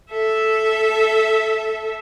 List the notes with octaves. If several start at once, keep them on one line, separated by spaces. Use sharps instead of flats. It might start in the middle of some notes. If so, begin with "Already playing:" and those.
A4 E5